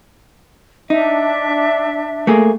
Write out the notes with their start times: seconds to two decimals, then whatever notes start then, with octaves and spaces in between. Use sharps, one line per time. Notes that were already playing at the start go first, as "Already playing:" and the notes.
0.90 D4 D#4 E5
2.27 A3 A#3 G#4